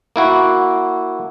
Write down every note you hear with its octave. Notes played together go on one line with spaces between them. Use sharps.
A#3 E4 F#4